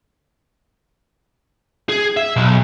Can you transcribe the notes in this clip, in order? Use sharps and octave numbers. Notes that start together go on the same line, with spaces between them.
G#4
E5
B1